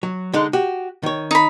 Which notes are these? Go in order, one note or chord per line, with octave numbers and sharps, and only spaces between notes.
F#3
D3 G#3 D#4
F#4 G4
D#3 C#5
D#4 B5